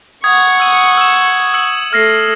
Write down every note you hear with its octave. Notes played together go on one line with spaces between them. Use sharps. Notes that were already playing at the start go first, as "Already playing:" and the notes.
F#5 C#6 D#6 G#6
E6 D#7
E6 E7
E6 C#7 F#7
A3 F6 A#6 C7